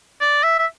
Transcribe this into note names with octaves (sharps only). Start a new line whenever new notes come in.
D5
E5
E5